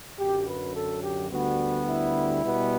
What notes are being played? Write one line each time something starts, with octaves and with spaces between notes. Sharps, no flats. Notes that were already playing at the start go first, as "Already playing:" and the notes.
F#2 D3 F#3 G4
B4
A4
G4
D2 D3 G3 B3 F#4
E4
B2 G3 B3